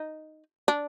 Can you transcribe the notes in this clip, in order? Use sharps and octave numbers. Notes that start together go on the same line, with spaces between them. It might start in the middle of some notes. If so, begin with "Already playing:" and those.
Already playing: D#4
D4